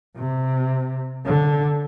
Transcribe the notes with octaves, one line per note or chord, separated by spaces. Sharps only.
C3
D3